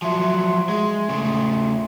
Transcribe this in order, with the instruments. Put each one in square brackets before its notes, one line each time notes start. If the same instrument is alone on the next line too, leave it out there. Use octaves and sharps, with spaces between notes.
[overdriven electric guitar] F3 F#3 [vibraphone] E5 C6
[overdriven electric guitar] G#3
C#3 A3